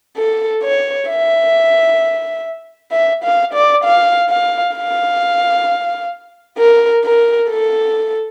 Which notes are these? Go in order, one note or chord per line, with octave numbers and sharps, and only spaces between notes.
A4
C#5
E5
E5
F5
D5
F5
F5
F5
A#4
A#4
A4